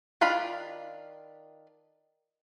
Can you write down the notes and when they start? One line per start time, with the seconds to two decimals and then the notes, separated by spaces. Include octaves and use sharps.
0.21 D#3 D4 F4 F5 B5